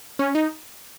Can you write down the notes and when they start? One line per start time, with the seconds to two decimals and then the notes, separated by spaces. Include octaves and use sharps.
0.19 C#4
0.35 D#4